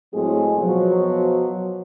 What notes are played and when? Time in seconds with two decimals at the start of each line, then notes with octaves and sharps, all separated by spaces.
0.13 A2 F#3 G#3 C4 G#4
0.57 B2 F3 F#3